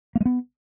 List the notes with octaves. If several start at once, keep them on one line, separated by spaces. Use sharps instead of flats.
A#3
G#3
B3